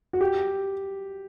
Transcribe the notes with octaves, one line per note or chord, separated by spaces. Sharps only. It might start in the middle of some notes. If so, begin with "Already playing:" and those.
F#4
G4